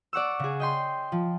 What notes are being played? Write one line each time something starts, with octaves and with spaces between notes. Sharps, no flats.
D5 F#5 C#6 E6
C#3 G#4
D#5 G5 C6
F3